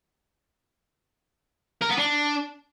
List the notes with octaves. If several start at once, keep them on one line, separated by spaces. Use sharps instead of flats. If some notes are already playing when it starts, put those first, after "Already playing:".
A#4
B3
D4